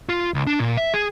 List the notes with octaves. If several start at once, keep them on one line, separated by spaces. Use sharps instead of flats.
F4
C#2
D4
A#2
E5
G#4